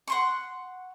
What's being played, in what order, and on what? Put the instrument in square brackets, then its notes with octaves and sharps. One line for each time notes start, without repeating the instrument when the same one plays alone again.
[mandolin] F#5 C6 C#6